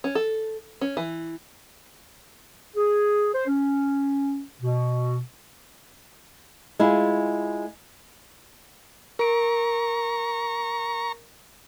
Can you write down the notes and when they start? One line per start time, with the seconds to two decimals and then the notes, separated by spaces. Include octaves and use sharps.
0.04 C#4
0.15 A4
0.81 C#4
0.97 E3
2.76 G#4
3.34 C5
3.47 C#4
4.62 B2
6.79 G#3 E4 F4 G#4
9.19 A#4 A#5 C#6 D7